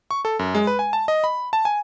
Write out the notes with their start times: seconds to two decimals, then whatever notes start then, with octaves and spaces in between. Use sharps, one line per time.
0.11 C#6
0.25 A4
0.39 F#2
0.55 G#3
0.67 B4
0.79 G#5
0.93 A5
1.08 D#5
1.24 B5
1.53 A5
1.65 G#5